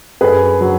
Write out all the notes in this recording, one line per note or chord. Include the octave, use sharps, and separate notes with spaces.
F#2 G#4 B4
F#3